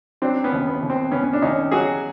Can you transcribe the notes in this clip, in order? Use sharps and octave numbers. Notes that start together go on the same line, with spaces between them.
F#3 C4 D4
B3 C#4
D#2
B3
D#2
C4
D#2 B3 C#4
C#4
D4
D#2 C#4 D#4
F#3 F#4 G#4